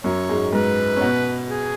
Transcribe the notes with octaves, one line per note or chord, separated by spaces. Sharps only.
F#2 F#3 C#5
G#2 G#3
G#2 G#3 B4
C#4
B2 B3
G#4